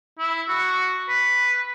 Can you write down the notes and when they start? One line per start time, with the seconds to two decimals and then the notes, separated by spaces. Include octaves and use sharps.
0.19 E4
0.48 F#4
1.09 B4